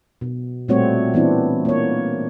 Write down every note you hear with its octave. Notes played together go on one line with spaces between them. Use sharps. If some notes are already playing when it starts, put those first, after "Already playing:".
B2
A#2 G3 A3 C4 F#4 C#5
E3 B3 C4 D4 E4
A#3 C#5